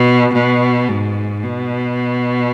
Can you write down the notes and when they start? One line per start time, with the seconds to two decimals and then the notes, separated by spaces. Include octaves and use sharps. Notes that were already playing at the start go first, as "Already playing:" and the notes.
Already playing: B2
0.34 B2
0.88 G#2
1.43 B2